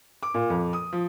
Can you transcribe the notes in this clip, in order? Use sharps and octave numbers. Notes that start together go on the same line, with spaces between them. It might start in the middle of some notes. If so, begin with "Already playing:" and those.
D6
A#2
F2
D#6
F3